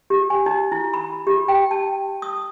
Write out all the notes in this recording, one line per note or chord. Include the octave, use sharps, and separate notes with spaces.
G4
G#5
D#4
E4
B5
G4
G5
A5
D#6